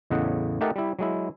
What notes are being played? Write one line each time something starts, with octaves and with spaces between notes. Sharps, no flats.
E2 A2 C#3 D#5 F#5
A3 D#4 G4 A#4 F#5 A5
G3 E4
F#3 G#3 E4